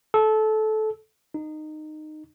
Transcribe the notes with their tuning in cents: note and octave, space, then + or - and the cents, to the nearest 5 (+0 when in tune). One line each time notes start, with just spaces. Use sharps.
A4 -20
D#4 -20